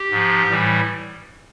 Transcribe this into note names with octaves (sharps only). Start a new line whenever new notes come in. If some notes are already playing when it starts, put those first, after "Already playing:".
Already playing: G4
G#2 F3
A2 E3 G3